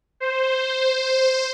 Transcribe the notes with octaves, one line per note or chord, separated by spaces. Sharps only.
C5